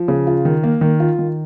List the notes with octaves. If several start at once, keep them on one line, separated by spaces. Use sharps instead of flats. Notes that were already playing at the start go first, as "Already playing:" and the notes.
Already playing: F3
C#3
F4
D#3
A#3
D#3
F4
D#3